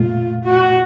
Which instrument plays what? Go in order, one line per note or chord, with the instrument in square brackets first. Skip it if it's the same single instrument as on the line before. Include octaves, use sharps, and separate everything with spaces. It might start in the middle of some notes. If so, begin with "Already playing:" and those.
Already playing: [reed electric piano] A#2 A3 [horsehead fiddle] F4
[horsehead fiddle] F#4